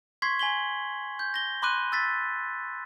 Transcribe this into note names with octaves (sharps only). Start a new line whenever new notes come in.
C6 C#6 G#6 B6 C7
G#5 B6 F#7 G7
G6
A#6 G7
B5 C6 D6 F#6 D#7
E6 A6 B6